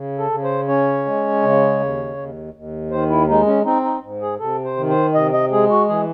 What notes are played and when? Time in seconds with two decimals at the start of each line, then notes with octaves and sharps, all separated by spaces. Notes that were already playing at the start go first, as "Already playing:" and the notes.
Already playing: C#3
0.18 A4
0.31 C#3
0.44 C5
0.68 C#4 C#5
1.05 G#3
1.42 C#3
1.79 D#2
2.17 D#2
2.54 D#2
2.91 D#3 C5
3.10 E4
3.28 G#3 D#4
3.47 C#4
3.65 C4 D#4
3.84 D#4
4.03 G#2
4.21 G#4
4.39 C3 A4
4.64 C5
4.77 D#3
4.89 C5
5.14 C3 D#5
5.32 D#5
5.51 G#3 G#4
5.70 F#4
5.88 E3 G#4